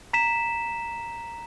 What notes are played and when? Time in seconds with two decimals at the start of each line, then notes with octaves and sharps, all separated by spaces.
0.13 A#5 B6 E7